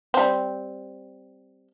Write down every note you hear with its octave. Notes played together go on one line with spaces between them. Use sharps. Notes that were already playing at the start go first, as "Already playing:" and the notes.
G3 C4